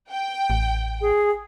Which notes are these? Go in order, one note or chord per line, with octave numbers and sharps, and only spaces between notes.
G5
A1
G#4